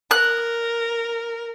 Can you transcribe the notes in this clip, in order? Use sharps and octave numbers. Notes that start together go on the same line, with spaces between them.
A#4 F#6